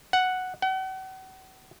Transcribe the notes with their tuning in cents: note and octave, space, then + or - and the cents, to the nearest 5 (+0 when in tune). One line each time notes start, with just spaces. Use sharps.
F#5 +0
F#5 +40